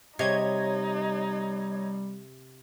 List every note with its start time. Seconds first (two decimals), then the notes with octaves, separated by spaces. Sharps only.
0.19 C3 G3 D#4 C#5 D#5 G#6